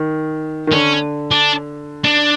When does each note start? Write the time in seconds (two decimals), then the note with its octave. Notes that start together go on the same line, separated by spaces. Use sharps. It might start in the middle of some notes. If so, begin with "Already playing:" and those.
Already playing: D#3
0.67 D#3
0.72 D3 C#4
1.31 D4
2.04 D4